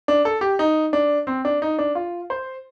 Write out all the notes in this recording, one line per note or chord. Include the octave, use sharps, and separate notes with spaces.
D4
A4
G4
D#4
D4
C4
D4
D#4
D4
F4
C5